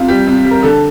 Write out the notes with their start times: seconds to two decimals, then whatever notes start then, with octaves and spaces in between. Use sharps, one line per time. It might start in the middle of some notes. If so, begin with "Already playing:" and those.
Already playing: C3 F4
0.08 G3 G4
0.27 C3
0.45 G3
0.51 A#4
0.63 D3 A4